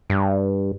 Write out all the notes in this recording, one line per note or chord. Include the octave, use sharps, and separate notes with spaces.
G2